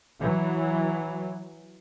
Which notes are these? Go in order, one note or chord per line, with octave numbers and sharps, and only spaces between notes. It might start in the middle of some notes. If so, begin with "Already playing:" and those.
E3 F#3